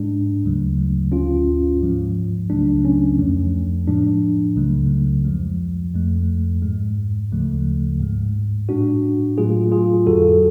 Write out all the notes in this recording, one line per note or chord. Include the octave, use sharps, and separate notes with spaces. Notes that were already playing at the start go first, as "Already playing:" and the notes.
Already playing: G#2 G#3 D4
D2 C#3 F#3 A3
D2 D3 G#3 C#4 F4
G#2 F3 G#3
C#2 C#3 F#3 A3 D4
C#4
F2 F3 A3
A2 F3 G#3 D4
C#2 C#3 F#3 A3
F2 F3 G#3
F2 F3 A3
G#2 G#3
D2 C#3 F3 A3
G#2 G#3
A2 G#3 D4 F#4
A2 F#3 A3 F4 G#4
F4 G#4
F2 D3 F#3 F#4 A4